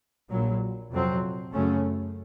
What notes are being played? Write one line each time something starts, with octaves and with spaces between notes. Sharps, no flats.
A#1 A#2 F#3
F2 C3 F#3 C4
F#2 C#3 A3 C#4